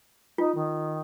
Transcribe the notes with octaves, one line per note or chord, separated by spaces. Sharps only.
D#4 F4
D#3